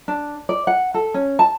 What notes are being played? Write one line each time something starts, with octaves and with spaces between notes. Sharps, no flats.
D4
D5
F#5
A4
C#4
A5